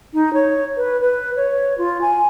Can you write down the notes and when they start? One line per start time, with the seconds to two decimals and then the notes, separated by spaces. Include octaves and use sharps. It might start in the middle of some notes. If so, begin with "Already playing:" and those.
0.13 D#4
0.34 C#5
0.77 B4
1.01 B4
1.36 C#5
1.78 F4
2.01 G#5